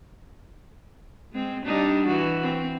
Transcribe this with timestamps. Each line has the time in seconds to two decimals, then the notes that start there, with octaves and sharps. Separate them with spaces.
1.32 G#3 C4
1.65 G3 D4 D#4
2.06 E3 F#4
2.43 C4